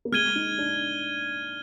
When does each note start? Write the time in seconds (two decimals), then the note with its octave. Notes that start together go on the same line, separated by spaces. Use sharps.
0.05 A#3
0.12 G#3 F6 G#6 D#7 G7
0.35 D#4
0.58 D4